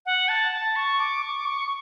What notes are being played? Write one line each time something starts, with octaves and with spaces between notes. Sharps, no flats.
F#5
A5
A5
C#6
D6
C#6
D6
C#6